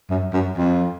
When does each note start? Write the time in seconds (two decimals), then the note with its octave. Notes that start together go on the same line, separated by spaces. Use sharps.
0.10 F#2
0.33 F#2
0.57 F2